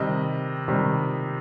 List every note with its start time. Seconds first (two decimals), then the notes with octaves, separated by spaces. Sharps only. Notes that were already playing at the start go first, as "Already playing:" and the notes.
Already playing: C3 D#3 G3 D#5
0.68 C3 D#3 G3